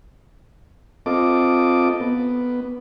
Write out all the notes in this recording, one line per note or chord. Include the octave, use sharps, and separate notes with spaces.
C4 F4 A4 D#5 D6
B3